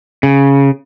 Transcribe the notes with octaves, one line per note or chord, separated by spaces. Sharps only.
C#3